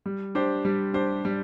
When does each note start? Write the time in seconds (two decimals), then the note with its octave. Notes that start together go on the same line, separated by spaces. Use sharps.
0.06 G3
0.35 D4 G4 C5
0.65 G3
0.94 D4 G4 C5
1.25 G3